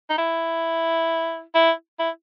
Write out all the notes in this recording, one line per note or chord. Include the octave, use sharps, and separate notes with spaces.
D#4
E4
E4
E4